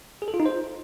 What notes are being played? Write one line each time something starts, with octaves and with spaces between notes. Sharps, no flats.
G#4
A4
F4
D#4
C5